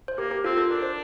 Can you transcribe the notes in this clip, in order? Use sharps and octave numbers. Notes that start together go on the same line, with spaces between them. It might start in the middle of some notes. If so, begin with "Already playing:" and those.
C5
A#3 G4 A#4
G4 A#4
C4 F4 A4
F4 A4
D4 A#4
C5